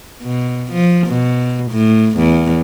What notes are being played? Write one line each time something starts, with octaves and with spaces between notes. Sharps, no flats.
B2
F3
B2
A2
E2